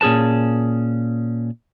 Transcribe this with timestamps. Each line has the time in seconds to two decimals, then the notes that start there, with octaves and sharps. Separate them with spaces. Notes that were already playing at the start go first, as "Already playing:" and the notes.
0.01 A#2 C#4 G#4 B4 A5